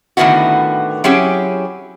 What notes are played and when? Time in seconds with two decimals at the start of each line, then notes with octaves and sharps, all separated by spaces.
0.17 A2 D3 D#3 B3 E4 F#4
1.04 F#3 C4 C#4 E4 G4 G#4